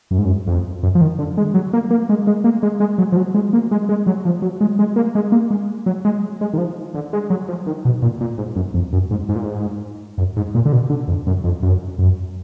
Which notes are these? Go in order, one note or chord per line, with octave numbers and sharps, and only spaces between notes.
F#2
G#2
F#2
F2
F#2
F3
D#3
D3
G#3
F#3
A#3
A#3
G#3
G#3
A#3
G#3
G#3
F#3
F3
F#3
G#3
A#3
G#3
G#3
F#3
F3
F#3
G#3
G#3
A#3
G#3
A#3
G#3
F#3
G#3
G#3
D#3
F3
D3
G#3
F#3
F3
D#3
B2
A#2
A#2
G#2
F#2
F2
F#2
G#2
G#2
A#2
G#2
F#2
G#2
A#2
D3
B2
D3
F2
F#2
F2
F#2
F#2